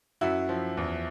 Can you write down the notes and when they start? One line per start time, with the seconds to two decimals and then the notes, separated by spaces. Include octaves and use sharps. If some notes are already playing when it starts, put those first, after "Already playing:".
0.21 F#2 E4 F#4
0.49 F3
0.77 E2